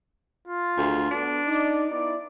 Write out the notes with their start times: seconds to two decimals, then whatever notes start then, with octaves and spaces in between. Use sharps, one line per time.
0.48 F4
0.77 D2 D#3 G#3
1.11 B3 D4 A4
1.47 D#4 D5
1.91 B3 D#4 E4 D5